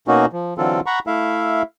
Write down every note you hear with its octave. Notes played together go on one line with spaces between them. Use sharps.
B2 A#3 C#4 D#4 F#4
F3
D3 E3 F#3 C4 F4 A4
F#5 A#5 B5 C#6
A3 E4 E5 F5